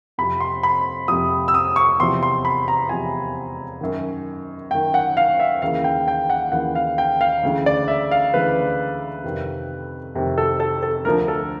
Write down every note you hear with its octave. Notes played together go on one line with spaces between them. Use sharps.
F2 C3 F3 B5
C6
B5
F2 C3 F3 D#6
E6
D#6
C#6
E2 C3 F3 C6
C6
B5
A#5
E2 C3 F3 G#5
F#2 D#3
F#2 D#3 G5
F#5
F5
E5
D#2 C#3 E3 F5
G5
G5
F#5
D#2 C#3 E3 F#5
F5
G5
F5
D2 C#3 E3
D5
E5
F5
D2 C#3 E3 B4
F2 C3 D#3
F2 C3 D#3
A4
A4
A4
D2 D3 F3 A#4
A4